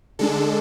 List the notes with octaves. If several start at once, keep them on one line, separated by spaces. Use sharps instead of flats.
D3 G#3 D4 A4